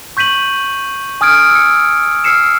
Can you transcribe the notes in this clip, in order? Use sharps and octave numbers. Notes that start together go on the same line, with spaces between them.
C#6 G6 B6 D#7 F#7
G#5 D#6 F6 G#6 D7
E6 C#7
E6 F6 C7 C#7 E7